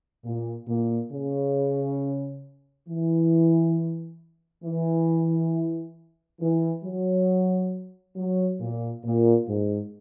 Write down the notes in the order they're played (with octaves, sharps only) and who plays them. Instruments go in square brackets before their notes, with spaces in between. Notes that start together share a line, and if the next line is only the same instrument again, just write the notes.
[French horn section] A#2
A#2
C#3
E3
E3
E3
F#3
F#3
A#2
A#2
G#2